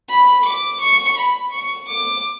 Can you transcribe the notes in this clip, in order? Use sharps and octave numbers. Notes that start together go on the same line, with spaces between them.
B5
D6
C#6
B5
C#6
D6